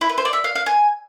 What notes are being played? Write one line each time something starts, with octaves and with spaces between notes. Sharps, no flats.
E4
B4
C5
D5
E5
F5
F5
G#5